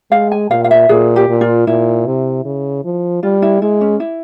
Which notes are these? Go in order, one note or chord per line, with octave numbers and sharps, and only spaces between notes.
G#3 F5
G#5
A#2 F5
F5
E5
A#2 G#4
G4
A#2
F4
A#2 E4
C3
C#3
F3
G3 F4
E4
G#3 E4
C#4
E4